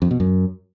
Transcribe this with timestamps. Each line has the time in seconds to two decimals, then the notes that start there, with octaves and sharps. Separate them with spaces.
0.02 F2
0.11 B2
0.20 F#2